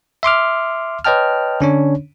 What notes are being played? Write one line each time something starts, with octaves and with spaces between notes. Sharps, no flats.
E5 C6 D6 F6
B4 C#5 D#5 G5 A5 F6
D3 C#4 D4 C#5